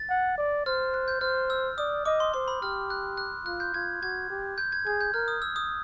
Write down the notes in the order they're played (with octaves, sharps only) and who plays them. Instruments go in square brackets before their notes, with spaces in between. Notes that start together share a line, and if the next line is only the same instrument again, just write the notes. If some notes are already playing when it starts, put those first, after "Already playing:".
Already playing: [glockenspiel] A6
[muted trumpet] F#5
D5
[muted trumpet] C5 [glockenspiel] F6
[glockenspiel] F#6
G6
[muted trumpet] C5 [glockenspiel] F6
[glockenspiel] E6
[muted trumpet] D5 [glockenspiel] D#6
[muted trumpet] D#5 [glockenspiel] D6
[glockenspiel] C6
[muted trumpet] C5 [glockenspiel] C6
[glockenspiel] B5
[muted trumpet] G4 [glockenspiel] F6
[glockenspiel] F#6
F#6
[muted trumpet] F4 [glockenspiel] F#6
[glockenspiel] G6
[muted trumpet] F4 [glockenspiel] G#6
[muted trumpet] F#4 [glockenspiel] G#6
[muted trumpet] G4
[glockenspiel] G6
G#6
[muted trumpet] G#4 [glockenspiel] G#6
[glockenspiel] G6
[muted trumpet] A#4 [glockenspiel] F6
[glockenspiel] D#6
E6
D#6